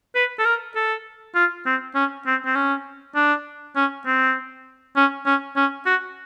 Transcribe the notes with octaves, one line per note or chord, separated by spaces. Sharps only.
B4
A4
A#4
A4
F4
C4
C#4
C4
C4
C#4
D4
C#4
C4
C#4
C#4
C#4
F#4